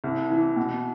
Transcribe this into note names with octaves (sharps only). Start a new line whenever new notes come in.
C2
E3
B2